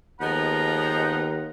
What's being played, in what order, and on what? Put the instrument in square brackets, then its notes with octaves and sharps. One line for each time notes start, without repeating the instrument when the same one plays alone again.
[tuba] D#2 [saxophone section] F3 G#3 B3 [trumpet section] F5 A#5 [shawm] F#5